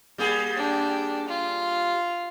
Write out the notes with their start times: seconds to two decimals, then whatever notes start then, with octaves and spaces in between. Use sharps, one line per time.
0.18 G3 A#3 G#4
0.56 D4 G5
1.28 F4